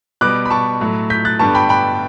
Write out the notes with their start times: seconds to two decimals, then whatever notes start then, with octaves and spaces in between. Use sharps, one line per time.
0.21 B2 G3 B3 D6 F#6
0.45 B5
0.50 A5 C#6
0.81 A2 F#3 A3
1.10 G6 B6
1.25 F#6 A6
1.39 G2 D3 G3 B3 A5 C#6
1.55 G5 B5
1.69 G5 B5